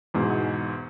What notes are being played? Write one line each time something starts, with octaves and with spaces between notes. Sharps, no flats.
E2 G#2 B2